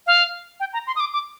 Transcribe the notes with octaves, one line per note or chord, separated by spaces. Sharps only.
F5
G5
A#5
C6
D#6
D6
D6